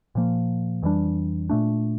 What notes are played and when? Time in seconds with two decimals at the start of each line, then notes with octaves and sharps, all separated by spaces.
0.15 A#2 F3 A#3
0.83 F2 E3 G3 D4
1.49 A#2 A3 D4